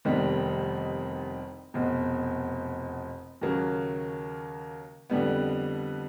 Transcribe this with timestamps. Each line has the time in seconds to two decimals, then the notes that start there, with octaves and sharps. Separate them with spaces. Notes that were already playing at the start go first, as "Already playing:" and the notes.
0.05 F1 E2 C3 D#3 G3
1.74 F1 E2 B2
3.41 D#2 C#3 F#3 A#3
5.10 F2 D3 G3 B3